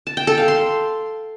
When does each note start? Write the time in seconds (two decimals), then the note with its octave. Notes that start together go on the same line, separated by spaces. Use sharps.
0.07 A5
0.17 G5
0.27 A4
0.38 F5
0.48 C6